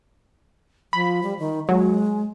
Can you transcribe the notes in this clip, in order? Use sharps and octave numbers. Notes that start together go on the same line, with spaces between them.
F3 B5
G3
D#3
F#3 G#3